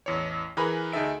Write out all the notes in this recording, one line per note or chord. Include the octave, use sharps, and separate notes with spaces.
A1 E2 C#5
E3 G#4 A#4 B4 A#5 B5
D2 D#4 G#4 A4 E5 D7